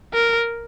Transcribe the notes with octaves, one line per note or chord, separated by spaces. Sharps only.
A#4